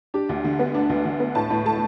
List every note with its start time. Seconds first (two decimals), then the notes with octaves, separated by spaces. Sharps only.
0.14 D4 G4
0.29 D2
0.44 D3
0.59 B3
0.75 D4
0.90 D2
1.05 D3
1.20 B3
1.35 A2 A5
1.50 A2
1.65 A3 A5